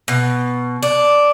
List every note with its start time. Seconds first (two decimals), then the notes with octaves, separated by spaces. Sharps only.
0.08 B2
0.83 D4